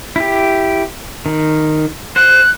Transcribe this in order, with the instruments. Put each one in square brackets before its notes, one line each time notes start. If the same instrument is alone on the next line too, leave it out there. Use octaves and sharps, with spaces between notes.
[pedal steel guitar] E4 G4
D#3
[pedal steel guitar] C5 [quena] F#6